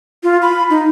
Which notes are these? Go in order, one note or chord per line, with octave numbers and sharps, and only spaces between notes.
F4
B5
D#4